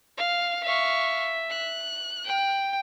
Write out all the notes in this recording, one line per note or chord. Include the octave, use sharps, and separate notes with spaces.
F5
E5 F5 C#6
F#6
G5